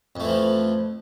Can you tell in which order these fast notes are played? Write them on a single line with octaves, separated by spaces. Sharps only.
F2 A3 E3 F3